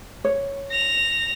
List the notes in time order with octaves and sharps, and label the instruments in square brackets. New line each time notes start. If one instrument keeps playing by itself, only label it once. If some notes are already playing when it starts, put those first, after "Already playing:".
[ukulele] C#5
[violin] A#6 F7